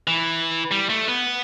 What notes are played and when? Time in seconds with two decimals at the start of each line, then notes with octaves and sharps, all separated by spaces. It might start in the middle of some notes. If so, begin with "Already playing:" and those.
0.07 E3
0.71 G3
0.89 A3
1.08 B3